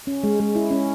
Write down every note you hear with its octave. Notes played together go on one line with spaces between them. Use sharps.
C#4
G#3
G#3
E4
C#4